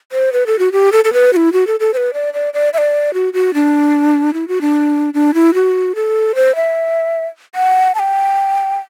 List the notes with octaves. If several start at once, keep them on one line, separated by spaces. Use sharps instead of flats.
C5
B4
A4
F#4
G4
A4
A4
B4
F#4
E4
F#4
A4
A4
C5
B4
D5
D5
D5
E5
D5
F#4
F#4
D4
E4
F#4
D4
D4
E4
F#4
A4
C5
E5
F#5
A5
G5